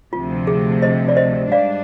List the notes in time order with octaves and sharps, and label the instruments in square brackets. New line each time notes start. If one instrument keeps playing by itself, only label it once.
[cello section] D2 C3 F3 [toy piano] F4
[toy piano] G#4
C5 D#5
D5
C5 D#5
[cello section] G#2 G3 D4 [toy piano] D5 F5